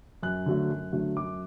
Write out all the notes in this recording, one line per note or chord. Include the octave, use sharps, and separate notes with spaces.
F#2 F#6
D3 F#3 A3
F#2
D3 F#3 A3
F#2 D6